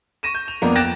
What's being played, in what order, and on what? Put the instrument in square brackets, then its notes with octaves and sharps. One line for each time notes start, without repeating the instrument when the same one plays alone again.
[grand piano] C#6 A#6 D#7 E7
G6
F7
F2 A#3 B3 D4 A#5
G5 F#6 A6 A#6 D7 E7